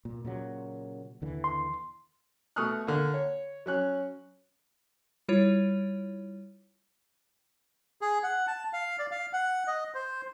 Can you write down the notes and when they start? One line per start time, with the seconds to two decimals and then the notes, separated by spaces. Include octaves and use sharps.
0.05 A#2
0.25 A#2 C#3 F#3
1.22 D#2 D3 E3
1.44 C6
2.56 B2 A3 C#6 D#6 F6 F#6
2.87 D3 A#3
3.14 C#5
3.66 F#3 C#4 F#6
5.29 G3 E4 F4 C#5
8.01 G#4
8.23 F#5
8.47 A5
8.73 F5
8.99 D5
9.11 F5
9.33 F#5
9.67 D#5
9.94 C5